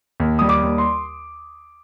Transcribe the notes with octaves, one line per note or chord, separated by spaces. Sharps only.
D#2
G3 D#6
D6
D#2
C6